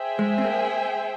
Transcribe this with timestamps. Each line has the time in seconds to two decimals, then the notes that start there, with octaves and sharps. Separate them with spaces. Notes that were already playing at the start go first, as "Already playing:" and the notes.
Already playing: G#4 C5 E5 G5
0.19 G#3
0.38 C4
0.44 A#3